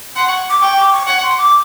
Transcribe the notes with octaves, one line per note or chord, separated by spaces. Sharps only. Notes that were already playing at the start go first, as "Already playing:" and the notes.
F#5 C6
C#6
D6
G5 C#6
D6
C#6
F#5 C#6
C6
D6